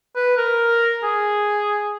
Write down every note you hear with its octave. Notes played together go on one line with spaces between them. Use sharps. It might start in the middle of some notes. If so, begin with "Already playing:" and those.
B4
A#4
G#4